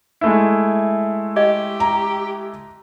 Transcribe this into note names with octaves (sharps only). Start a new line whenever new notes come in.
G#3 A3 E4
G4 D#5
A#5